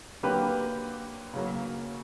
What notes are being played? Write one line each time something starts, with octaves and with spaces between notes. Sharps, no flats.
D3 F#3 A#3 G4 B4
C#3 F#3 A#3